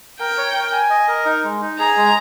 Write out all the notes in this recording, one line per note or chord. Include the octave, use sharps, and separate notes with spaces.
A#4 G5
C#5
A#4
G#5
D#5
A#4
D#4
G#3
D#4
G#4 A#5
G#3